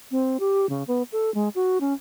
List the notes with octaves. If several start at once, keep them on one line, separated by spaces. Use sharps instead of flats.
C4
G4
C#3
B3
A4
G#3
F#4
C#4